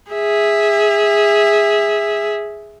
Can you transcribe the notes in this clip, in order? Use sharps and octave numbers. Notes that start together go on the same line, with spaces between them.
G#4 E5